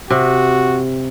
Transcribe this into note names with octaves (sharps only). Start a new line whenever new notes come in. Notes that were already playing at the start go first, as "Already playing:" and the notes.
C3 F#4